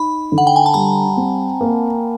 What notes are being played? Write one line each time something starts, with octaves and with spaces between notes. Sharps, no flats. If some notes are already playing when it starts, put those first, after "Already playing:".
Already playing: D#4 B5
D3
F#5
G5
G#5
A5
G3 A#5
C4
A#3